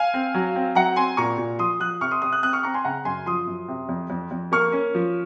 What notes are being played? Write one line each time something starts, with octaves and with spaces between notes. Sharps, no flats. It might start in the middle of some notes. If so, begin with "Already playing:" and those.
Already playing: F5 G#5
C4
F#3
C4
F#3 F#5 A#5
C4 G#5 C6
A#2 A#5 C#6
A#2
F3 C6 D#6
F3 D#6 F#6
C3 C#6 F6
C6 D#6
C3 C6 D#6
D#6 F#6
C4 D#6 F#6
C#6 F6
C4 A#5 C#6
G#5 C6
C#3 F#5 A#5
F#2 G#5 C6
F3 C6 D#6
F#2
C3
F2
F2
F2
A#3 C#6 F6
C#4
F3